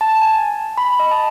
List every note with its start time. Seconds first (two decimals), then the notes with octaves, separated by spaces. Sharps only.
0.01 A5
0.21 G#5
0.78 B5
0.99 D#5
1.11 A5